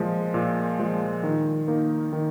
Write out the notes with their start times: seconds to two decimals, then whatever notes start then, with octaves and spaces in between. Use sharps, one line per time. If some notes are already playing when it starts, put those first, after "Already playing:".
Already playing: A#2 F3 G#3
0.34 A#2
0.79 F3 G#3
1.23 D#3
1.68 A#3 D#4 A#4
2.13 D#3